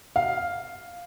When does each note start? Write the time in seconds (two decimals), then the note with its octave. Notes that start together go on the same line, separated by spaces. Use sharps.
0.16 F5